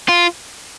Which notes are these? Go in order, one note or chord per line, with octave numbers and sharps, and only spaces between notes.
F4